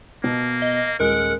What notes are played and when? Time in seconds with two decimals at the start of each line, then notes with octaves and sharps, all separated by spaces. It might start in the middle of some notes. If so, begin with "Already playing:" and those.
0.24 B2 A#3
0.62 D#5
1.00 D#1 G#3 A#4 F#5 F#6